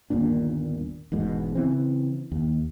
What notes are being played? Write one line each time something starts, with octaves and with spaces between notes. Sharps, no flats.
G1 D#2 A#2 D4
E1 E2 G#2 B2
C#3 E3 C4
D#2